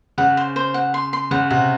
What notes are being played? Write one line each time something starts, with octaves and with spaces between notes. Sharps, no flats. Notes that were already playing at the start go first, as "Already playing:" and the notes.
C#3 F#5
C5
C5
F#5
C6
C6
C#3 F#5
C3 F#5